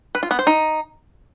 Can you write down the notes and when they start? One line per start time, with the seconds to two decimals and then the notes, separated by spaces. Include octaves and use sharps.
0.15 B4
0.23 F4
0.31 B3
0.39 C5
0.47 D#4